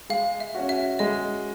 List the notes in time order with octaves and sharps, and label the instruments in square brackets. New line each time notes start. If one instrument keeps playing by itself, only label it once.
[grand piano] G#3 [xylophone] F5
[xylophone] E5
[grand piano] C#4 F#4
[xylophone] E5
[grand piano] G#3 [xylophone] D#5